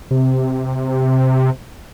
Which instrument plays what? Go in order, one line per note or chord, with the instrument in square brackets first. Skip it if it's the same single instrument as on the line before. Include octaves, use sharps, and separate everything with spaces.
[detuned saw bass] C3